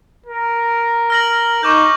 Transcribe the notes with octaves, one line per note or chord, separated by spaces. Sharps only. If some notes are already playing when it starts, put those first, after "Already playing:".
A#4
F6 A#6 F#7
D#4 C#6 D6 G6